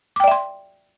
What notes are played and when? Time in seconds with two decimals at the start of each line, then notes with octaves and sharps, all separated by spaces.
0.16 D6
0.20 G5
0.24 D5
0.28 E5
0.31 C6